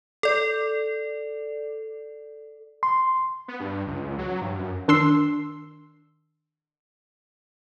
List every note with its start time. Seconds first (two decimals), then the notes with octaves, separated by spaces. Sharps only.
0.23 A4 D5
2.83 C6
3.48 B3
3.60 G2
3.87 C#2
4.19 F#3
4.42 G2
4.59 F#2
4.88 D#3 D4 C6 E6 C7